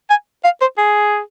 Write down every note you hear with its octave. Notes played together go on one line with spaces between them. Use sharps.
G#5
F5
C5
G#4